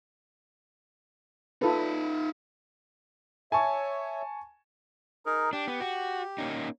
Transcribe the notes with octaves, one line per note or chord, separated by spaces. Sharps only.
D#4 F4 A4 B4 E5
C#5 E5 G#5 A5 C#6
D#4 G#4 A#4
D4 G4
B3
F#4
A#3 C#4 D#4